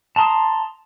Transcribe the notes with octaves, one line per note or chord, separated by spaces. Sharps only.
A5 A#5 C6 D#6